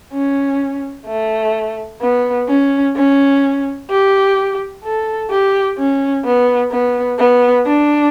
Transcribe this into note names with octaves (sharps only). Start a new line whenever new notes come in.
C#4
A3
B3
C#4
C#4
G4
A4
G4
C#4
B3
B3
B3
D4